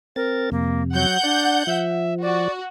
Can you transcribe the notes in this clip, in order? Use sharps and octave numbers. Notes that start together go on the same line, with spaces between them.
C4 A#4 A6
F2 C3 A#3
F#3 F#5 G6
D4 D5
F3 E5
F#4 D5